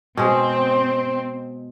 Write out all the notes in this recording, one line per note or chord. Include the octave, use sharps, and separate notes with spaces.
B2 G#3 C4